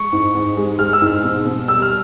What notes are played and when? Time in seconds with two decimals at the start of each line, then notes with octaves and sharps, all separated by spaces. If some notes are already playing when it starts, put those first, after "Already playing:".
Already playing: G#3 C#6
0.12 G#2
0.35 G#2
0.57 G#3
0.79 G#3 F6
0.93 E6
1.01 G#2
1.07 F6
1.24 B2
1.45 B2
1.68 G3 E6
1.82 F6